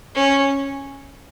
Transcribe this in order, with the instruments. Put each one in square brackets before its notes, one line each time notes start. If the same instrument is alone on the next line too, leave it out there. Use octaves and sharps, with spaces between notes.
[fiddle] C#4